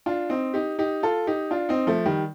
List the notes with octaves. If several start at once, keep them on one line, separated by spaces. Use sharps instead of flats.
D4 F4
C4 D#4
D#4 G4
D#4 G4
F4 A4
D#4 G4
D4 F4
C4 D#4
F3 A3
D#3 G3